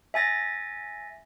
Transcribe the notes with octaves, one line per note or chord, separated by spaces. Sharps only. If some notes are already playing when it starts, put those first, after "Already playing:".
E5 G#5 A6 A#6